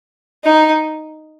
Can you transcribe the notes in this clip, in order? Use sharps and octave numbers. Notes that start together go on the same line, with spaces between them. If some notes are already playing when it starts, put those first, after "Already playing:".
D#4